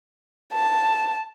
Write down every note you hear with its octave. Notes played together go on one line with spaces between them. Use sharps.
A5